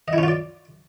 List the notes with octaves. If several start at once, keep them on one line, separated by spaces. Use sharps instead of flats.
D#5
E4
C#4
F4
D5